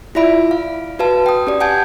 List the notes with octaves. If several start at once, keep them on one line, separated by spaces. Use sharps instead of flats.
E4 F4 D5 E5 B5 D7
F5
F#4 B4 F5 A5
G5 D#6
C#4 G4 D5
F#5 G#5 A5 G6 G#6